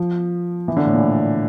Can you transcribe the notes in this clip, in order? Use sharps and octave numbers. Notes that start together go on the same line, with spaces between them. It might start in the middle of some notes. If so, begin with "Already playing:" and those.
Already playing: F3
E3
D3
A2
A#2